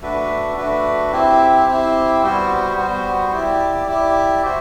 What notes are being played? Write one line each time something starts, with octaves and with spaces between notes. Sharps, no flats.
A3 D4 F#4 B4
A3 D4 F#4 B4
C4 E4 G4
C4 E4 G4
G3 B3 F#4 C5
G3 B3 F#4 C5
E4 G4 D5
E4 G4 D5
F#4 C5 E5